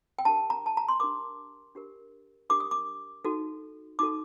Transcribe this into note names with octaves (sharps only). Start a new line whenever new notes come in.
G5
D4 G4 A#4 A5
A#5
A5
A#5
C6
D4 G4 A#4 D6
D4 G4 A#4
D4 G4 A#4 D6
D#6
D6
D#4 F#4 A4
D#4 F#4 A4 D6